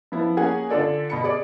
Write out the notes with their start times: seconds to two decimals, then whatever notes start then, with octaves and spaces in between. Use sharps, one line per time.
0.12 F3 B3 E4
0.37 A#3 C#4 G#4 F#5 G#5
0.70 D3 D4 F4 A4 D5
1.10 B2 B5 C#7
1.24 G#4 D5 D6